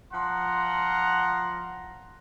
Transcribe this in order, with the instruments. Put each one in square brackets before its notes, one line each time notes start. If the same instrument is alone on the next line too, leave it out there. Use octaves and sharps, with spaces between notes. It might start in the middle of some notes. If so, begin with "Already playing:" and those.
[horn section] F3 F#5 A#5 C6